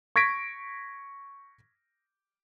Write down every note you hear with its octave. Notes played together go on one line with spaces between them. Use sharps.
C#6 G#6 A#6 B6 D7